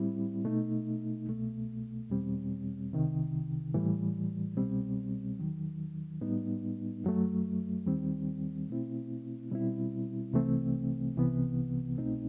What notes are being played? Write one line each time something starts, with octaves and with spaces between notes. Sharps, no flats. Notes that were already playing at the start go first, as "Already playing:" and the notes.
Already playing: A2 G3 C4 E4
B2 A3 D#4
C2 B2 A3
E2 B2 G3 C4
C2 C3 D#3
A2 E3 G3
C2 B2 G3 C4
E2 D#3 F#3
A2 G3 B3 D#4
F#2 F#3 A3
D#2 D#3 G3 C4
B2 A3 C4 E4
B2 G3 C4 E4
C2 C3 E3 A3 C4
C2 C3 E3 B3
C2 B2 A3 C4 D#4